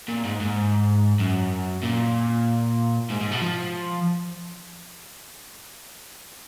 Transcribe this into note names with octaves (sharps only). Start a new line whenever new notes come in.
A#2
G#2
G#2
F#2
A#2
G#2
G#2
B2
F3